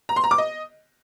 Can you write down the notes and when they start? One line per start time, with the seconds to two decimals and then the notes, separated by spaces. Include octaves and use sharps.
0.09 A#5
0.16 C6
0.24 A#5
0.31 D6
0.38 D#5